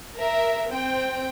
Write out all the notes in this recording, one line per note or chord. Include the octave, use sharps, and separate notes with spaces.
A#4 E5
C4 G5